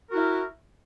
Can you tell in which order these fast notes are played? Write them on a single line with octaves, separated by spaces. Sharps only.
A#4 F#4 E4